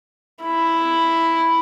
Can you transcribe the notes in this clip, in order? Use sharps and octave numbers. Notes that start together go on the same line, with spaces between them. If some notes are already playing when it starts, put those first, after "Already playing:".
E4